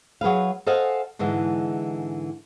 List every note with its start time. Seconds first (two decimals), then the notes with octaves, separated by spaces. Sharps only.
0.21 F#3 G#4 B4 F5
0.66 A4 C5 D#5 F5 F#5 G#5
1.19 G#2 D3 E3 G#3